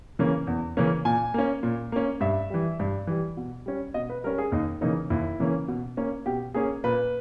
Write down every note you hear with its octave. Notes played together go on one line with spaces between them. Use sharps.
C#3 E3 A#3 C#4
E2
C#3 E3 A#3 C#4
A#2 G#5
A#3 C#4
A#2
A#3 C#4
G2 E5
E3 G3
G2
E3 G3
B2
G3 C#4
B2 D#5
B4
G3 C#4 A#4
G#4
D#2 D#4
C#3 E3 A#3 C#4 D#4
D#2 E4
C#3 E3 A#3 C#4
B2
A#3 C#4
B2 G4
A#3 C#4 G#4
A#2 B4